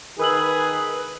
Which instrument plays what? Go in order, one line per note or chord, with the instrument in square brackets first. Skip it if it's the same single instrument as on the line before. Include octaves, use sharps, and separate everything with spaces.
[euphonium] D#3 [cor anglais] G#4 [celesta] A#4 E6 F#7 [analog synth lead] B4